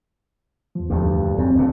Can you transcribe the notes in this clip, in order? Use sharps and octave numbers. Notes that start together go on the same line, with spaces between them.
E2 F3
D2 G2
F#2 C4
D2 A#2